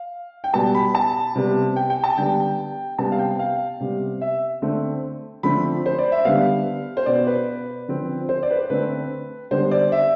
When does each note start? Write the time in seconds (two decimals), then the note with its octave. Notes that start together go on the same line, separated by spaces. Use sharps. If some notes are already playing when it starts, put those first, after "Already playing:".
Already playing: F5
0.44 G5
0.54 B2 G3 B3 A5
0.75 B5
0.95 A5
1.35 C3 G3 B3
1.76 G5
1.90 G5
2.04 A5
2.17 D3 G3 B3 G5
2.99 C3 G3 B3 A5
3.12 F5
3.19 G5
3.39 F5
3.80 C3 G3 B3
4.21 E5
4.62 D3 A3 C4
5.43 D3 F3 A3 C4 B5
5.86 C5
5.99 D5
6.12 E5
6.25 D3 G3 B3 F5
6.97 C5
7.06 B2 B3 D5
7.27 B4
7.88 D3 F3 C4
8.29 C5
8.43 D5
8.51 B4
8.56 C5
8.70 D3 A3 C4 B4
9.51 D3 G3 B3 C5
9.71 D5
9.92 E5